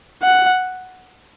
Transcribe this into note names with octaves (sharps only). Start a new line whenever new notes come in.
F#5